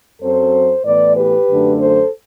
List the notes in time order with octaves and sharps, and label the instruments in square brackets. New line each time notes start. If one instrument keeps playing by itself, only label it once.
[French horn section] F#2 F#3 C4 A4 C5
A2 E3 B3 B4 D5
G4 B4
F#2 D3 A3 D4
A4 C5